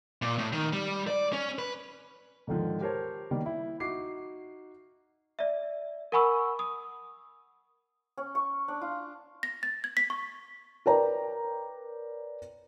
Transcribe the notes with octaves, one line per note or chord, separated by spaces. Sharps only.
A#2
A2
D#3
G3
D5
C#4
B4
G#2 D3 D#3 F3
G4 A#4 C5 C#5 A5
D#3 G3 A#3
E4
D#4 F#4 D6 C7
D5 E5
A#4 F#5 G#5 B5 C#6 E6
D#6
C#4
C#6
D4
F4
A#6
A6
G#6
B6
C#6
A#4 B4 C#5 D5 G5 A#5